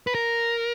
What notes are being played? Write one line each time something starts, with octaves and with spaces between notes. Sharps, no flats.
B4
A#4